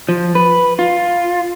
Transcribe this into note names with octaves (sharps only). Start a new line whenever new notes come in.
F3
B4
F4